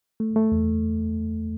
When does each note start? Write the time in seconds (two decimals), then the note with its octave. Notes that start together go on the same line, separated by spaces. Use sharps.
0.20 A3
0.36 A3
0.52 E2